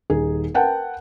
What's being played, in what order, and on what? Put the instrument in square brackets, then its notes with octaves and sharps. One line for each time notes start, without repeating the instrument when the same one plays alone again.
[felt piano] D#1 D#4 G#4
A#4 B4 F#5 G5 A5